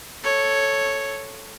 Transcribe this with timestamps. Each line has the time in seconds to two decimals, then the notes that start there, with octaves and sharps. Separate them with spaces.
0.23 A4 C#5